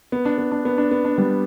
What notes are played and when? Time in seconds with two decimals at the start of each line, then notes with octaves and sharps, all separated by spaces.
0.12 B3
0.25 D4
0.38 B3
0.52 D4
0.65 B3
0.78 D4
0.91 B3
1.05 D4
1.18 G3 B3